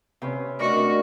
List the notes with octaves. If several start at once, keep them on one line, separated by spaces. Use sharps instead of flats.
C3 C#4 B4 G5
A3 D4 F#4 A#4 D5 D#5 C#6